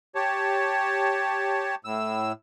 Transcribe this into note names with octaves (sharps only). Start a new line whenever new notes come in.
G4 C#5 A5
A2 E6